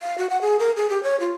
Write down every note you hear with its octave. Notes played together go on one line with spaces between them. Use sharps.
F5
F#4
F#5
G#4
A#4
G#4
G4
C#5
F4